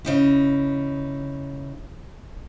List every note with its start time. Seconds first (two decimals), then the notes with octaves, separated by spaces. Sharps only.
0.05 C#3 D#4 E4